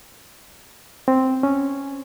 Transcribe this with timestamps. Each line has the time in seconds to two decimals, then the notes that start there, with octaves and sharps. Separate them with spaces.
1.08 C4
1.43 C#4